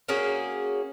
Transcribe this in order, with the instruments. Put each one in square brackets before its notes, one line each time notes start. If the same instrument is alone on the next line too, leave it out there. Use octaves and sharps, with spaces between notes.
[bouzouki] A#3 C#4 F#4 G#4